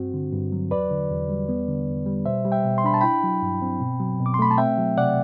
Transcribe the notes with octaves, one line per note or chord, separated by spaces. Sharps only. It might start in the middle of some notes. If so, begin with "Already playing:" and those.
Already playing: G2 C4 F#4
D3
G2
F#3
E2 B4 D5
D3
E2
G3
B3
D3
E2
G3
B2 C5 E5
G3
E5 G5
B2
C6
D4 B5
A5
E4 G5 B5
F#3
G2
C4
B2
F#3
B2
D6
C6
A3 B5
A5
C4 E5 G5
F#3
C3 D5 F#5